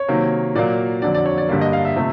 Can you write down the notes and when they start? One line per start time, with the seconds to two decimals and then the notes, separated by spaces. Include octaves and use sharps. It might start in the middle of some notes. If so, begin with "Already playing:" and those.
Already playing: C#5
0.08 C3 D#3 F#3 A#3
0.55 A#2 F#3 A#3 D5
1.02 F2 D3 F#3 D5
1.15 D5
1.26 C#5
1.38 D5
1.49 G2 D3 G3 A#3 D5
1.61 D#5
1.73 F5
1.85 E5
1.96 C3 F3 A3 C4